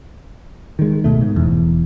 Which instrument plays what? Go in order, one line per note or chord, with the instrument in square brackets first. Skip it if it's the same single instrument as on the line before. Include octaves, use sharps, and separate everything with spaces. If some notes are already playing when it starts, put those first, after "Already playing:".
[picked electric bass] D#3 G#3
D1 F2 B2 A3
G#2
E1 E2